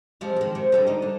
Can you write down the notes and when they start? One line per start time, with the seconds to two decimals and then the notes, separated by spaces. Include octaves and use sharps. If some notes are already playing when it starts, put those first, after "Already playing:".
0.21 C3 F3 G#3
0.36 D#3 G#3
0.55 C3
0.72 D3 G3 G#3
0.87 D4 D#4
1.02 D3